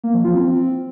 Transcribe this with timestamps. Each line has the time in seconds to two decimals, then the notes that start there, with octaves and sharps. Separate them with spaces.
0.04 A#3
0.14 F3
0.25 F4
0.35 C4